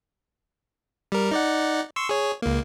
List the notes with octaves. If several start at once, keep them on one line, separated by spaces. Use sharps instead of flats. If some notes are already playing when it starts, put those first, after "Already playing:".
G3 A#4
D#4 D5 F#5
C6 C#6 E6
G#4 C#5
C#2 A#3